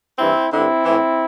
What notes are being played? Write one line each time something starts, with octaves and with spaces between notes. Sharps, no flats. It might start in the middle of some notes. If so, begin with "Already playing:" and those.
G2 E3 C4 E4
G2 D3 C4 E4
A2 E3